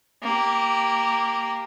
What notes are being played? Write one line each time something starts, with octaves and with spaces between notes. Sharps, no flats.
A#3 G4